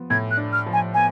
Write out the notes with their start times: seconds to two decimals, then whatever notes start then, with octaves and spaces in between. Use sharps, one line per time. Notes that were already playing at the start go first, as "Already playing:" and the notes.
Already playing: F3 B3
0.10 A2 G#6
0.31 F#6
0.37 D4
0.53 F6
0.66 F3
0.73 G#5
0.94 B3 G#5